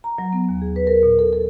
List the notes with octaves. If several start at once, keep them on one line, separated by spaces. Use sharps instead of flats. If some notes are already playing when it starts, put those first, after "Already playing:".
A#5
F#3
B3
D#2
G#4
B4
A#4
A#2
A4
A4